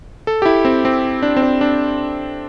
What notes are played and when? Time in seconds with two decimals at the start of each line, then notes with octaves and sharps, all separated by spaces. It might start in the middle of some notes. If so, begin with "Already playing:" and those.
0.27 A4
0.42 G4
0.46 E4
0.65 C4
0.85 C4
1.23 D4
1.37 C4
1.43 D4
1.61 D4